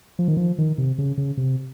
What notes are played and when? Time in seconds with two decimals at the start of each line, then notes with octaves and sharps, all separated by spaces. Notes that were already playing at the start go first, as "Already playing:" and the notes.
0.19 F3
0.28 D#3
0.37 F3
0.58 D#3
0.78 C3
0.98 C#3
1.18 C#3
1.37 C3